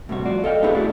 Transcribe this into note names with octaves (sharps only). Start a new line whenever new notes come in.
A2 C3 G3 F#4
F2 F4 F#4 D5
A4 D#5 F5 G5
A3 B3 D#4 E4 G4 G#4
C#4 E4 F#4 G#4 D5